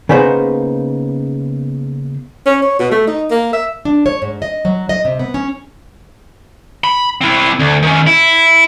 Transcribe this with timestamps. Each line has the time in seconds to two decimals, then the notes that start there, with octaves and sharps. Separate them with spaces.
0.09 C#3 A#3 B3 D#4 C5
2.46 C#4
2.62 C#5
2.80 B2
2.91 A3
3.07 D#4
3.31 A#3
3.53 E5
3.85 D4
4.06 C#5
4.22 G#2
4.42 D#5
4.65 F#3
4.89 D#5
5.05 C3
5.19 B3
5.34 C#4
6.84 B5
7.21 C4 E4
7.60 D2
7.83 D#3 C#4
8.07 E4